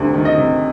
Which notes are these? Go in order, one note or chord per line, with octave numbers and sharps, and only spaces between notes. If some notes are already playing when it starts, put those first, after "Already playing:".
Already playing: D2 C3 G3
D#3
D#5
C3